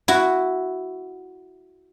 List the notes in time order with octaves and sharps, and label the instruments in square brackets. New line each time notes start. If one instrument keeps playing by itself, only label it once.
[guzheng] E4 F#4